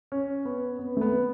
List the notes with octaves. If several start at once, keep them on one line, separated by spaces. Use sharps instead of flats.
C#4
B3
B3
A3
B3